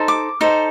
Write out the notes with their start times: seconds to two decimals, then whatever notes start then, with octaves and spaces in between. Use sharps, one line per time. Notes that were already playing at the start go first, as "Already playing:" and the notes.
Already playing: D#4 A4 C5
0.08 D6
0.41 D#4 A4 C5